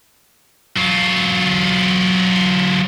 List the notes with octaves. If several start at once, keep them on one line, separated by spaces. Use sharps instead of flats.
F#3 F4